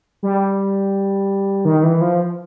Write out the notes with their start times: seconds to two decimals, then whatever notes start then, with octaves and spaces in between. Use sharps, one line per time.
0.23 G3
1.65 D#3
1.83 E3
2.01 F3